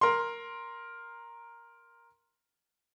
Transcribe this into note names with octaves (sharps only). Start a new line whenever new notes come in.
A#4 C6